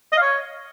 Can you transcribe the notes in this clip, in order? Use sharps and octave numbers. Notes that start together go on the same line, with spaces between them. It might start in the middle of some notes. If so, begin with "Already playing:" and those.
D#5
F5
C#5